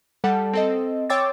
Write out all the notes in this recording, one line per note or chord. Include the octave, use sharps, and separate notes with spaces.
G3 A4 F#5 A5
C4 A4 D#5
C#5 G5 C6 D6 E6 A6